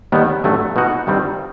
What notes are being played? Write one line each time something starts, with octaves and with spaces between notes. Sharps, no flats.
D#2 D#3 G3 B3
A1 G2 F#3 A3
B2 A3 D#4 F#4
G2 D#3 G3 C4